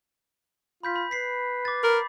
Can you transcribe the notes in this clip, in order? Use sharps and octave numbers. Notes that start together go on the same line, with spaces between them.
F4 B5 G6 B6
B5
B4 B6 C7
D6 A6
A#4 B5